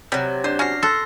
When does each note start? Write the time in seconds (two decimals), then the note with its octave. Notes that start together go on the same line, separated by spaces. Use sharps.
0.12 C3 F#3 G3
0.44 D4 C5 D5
0.59 C#4 F#4 F6 A#6 C7
0.83 A4 C6 F#6 A#6